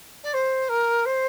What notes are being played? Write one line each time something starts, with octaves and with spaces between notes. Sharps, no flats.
D5
C5
A#4
C5